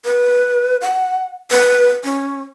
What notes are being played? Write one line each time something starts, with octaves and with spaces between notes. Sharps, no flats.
B4
F#5
B4
C#4